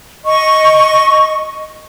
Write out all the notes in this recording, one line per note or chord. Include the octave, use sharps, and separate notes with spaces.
D#5 C#6